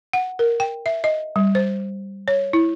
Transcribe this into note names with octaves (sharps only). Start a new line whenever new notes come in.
F#5
A#4
G5
E5
D#5
G3
C5
C#5
E4